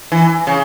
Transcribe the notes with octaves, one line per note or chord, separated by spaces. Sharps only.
E3
C#3